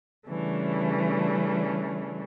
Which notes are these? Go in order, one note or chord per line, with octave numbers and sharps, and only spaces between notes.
C#3 E3 G3 A3 C#4 D4